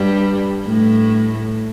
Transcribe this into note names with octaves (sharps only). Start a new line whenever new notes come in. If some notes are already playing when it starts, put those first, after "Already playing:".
Already playing: G2 G3
A2 A3